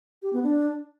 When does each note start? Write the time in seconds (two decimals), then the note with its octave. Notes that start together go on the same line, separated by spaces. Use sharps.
0.22 G4
0.33 B3
0.43 D4